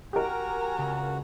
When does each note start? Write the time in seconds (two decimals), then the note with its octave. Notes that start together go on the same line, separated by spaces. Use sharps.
0.13 F#4 G4 A#4 G#5 A#5
0.79 C#2